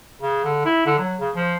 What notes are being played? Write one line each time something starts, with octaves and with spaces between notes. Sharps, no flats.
C#3
D3
E4
D3
F#3
C#3
F3